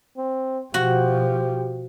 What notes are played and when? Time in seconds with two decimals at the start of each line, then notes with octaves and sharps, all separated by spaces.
0.17 C4
0.74 B2 F3 F#4 G4